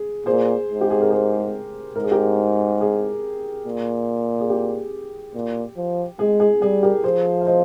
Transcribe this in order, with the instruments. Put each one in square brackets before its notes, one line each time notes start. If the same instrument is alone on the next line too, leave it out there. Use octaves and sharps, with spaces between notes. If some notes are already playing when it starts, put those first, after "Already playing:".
Already playing: [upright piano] G#4
[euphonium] A#2 [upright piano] G#4 C5
[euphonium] G#2
[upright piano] G4
G#4
A#4
G#4 C5
[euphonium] G#2 [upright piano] A#4
[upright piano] G#4
G4 A#4
G#4
[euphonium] A#2
[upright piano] G#4
G4
[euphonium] A#2
F3
[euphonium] G#3 [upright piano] G#4
[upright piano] G#4
[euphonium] G3 [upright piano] G#4
[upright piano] G4 A#4
[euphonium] F3 [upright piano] G#4 C5
[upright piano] F5
C5 D#5